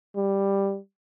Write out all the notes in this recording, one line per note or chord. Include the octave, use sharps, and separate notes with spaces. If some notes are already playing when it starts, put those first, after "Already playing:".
G3